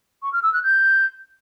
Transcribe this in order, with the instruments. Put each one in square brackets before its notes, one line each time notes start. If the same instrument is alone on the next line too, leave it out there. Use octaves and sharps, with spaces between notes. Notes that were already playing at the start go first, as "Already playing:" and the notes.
[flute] C#6
F6
E6
F#6
G6